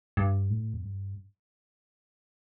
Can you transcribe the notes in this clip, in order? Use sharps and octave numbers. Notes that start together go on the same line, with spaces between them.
G2
A2
F2
G2